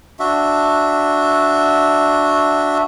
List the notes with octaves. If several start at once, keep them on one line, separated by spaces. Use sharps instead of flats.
D4 F#4 E5